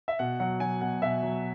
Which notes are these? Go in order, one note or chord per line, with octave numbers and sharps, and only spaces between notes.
E5
B2 F#5
F#3 F#5
F#3 G#5
B2 F#5
B2 E5
F#3